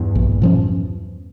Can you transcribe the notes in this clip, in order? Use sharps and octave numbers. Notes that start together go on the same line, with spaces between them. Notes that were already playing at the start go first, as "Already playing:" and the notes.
Already playing: E2 G2
A#1
A#2 F3 C#4